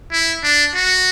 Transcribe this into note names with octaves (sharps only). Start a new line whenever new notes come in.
E4
D4
F#4